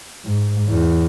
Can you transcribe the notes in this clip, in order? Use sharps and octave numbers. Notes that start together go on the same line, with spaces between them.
G#2
E2